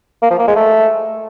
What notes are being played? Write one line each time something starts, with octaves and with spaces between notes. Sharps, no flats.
A#3
F3
A#3
G#3
A3